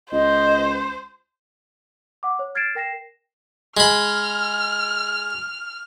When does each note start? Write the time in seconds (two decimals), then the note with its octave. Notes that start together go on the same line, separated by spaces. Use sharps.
0.12 C#2 C5 D#5
2.23 F#5 D6
2.39 C#5
2.55 F6 G#6 A6 C7 D7 E7
2.75 A#4 G5 A#6 C7 E7
3.77 G#3 B5 F6